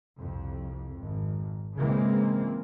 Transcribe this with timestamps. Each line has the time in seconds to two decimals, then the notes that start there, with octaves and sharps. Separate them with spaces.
0.19 C2 F2
0.97 G#1
1.77 C#3 E3 G#3 A#3 C4